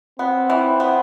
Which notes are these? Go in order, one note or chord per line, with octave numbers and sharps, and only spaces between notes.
B3 C4
E3
B3